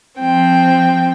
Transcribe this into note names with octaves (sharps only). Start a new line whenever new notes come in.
F3 C4 G5